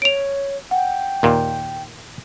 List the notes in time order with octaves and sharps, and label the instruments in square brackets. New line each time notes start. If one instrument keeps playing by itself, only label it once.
[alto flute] C#5 [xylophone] D7 F7
[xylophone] F#5 [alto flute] G5
[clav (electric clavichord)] D#2 A#2